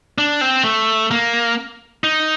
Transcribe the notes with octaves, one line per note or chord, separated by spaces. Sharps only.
D4
C4
A3
A#3
D#4